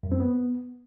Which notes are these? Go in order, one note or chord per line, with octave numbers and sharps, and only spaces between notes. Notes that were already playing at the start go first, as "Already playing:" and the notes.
F#2
C4
B3